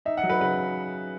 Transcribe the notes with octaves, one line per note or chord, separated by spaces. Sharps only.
D#4 E5
F#5
F#3
B4
C#3 B4